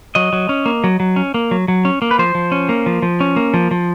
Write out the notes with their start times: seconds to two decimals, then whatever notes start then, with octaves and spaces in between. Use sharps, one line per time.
0.15 F#3 D#5
0.33 F#3
0.49 C#4
0.66 A#3
0.84 F#3
1.00 F#3
1.16 C#4
1.34 A#3
1.51 F#3
1.68 F#3
1.85 C#4
2.02 A#3
2.11 B4
2.19 F3 C5
2.35 F3
2.52 C#4
2.69 A#3
2.86 F3
3.02 F3
3.20 C#4
3.36 A#3
3.54 F3
3.71 F3